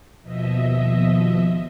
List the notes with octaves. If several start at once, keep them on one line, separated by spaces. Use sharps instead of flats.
D#2 B2 F3 D#5 E5